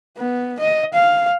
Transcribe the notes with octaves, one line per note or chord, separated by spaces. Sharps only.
B3
D#5
F5